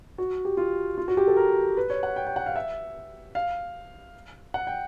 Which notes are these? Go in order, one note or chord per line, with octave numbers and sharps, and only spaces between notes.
F#4
G4
F4
F4
F#4
G4
A4
A#4
B4
C#5
F#5
G5
G5
F#5
F5
E5
F5
F#5
G5